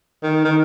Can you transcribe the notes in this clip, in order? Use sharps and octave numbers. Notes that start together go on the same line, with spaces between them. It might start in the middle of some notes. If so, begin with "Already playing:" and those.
D#3
D#3